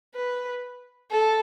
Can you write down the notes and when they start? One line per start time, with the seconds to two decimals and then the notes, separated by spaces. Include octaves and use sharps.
0.15 B4
1.12 A4